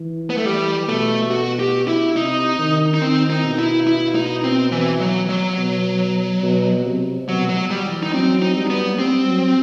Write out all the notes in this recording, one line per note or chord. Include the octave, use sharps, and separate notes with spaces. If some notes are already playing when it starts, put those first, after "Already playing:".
Already playing: E3
B3
A3
E3 G3
B2 A3
F#4
G4
E4
C3 D#4
D#3
D#4
D#3 C4
D#4
B2
E4
E4
D#4
C4
E3
F#3
F#3
B2
B2
C3
B2 F#3
F#3
G3
E3
D#4
F#3 C4
D#4
G3
B3
G3 C4
F#3